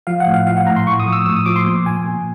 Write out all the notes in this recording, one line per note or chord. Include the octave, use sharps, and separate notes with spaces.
F3 F5
F#5
A2
F5
F3 F5
F#5
A2 A#5
C6
A2 C#6
D#6
F3
E6
A2 E6
D#6
F3 D6
C6
A#2
A#2 G#5
A#2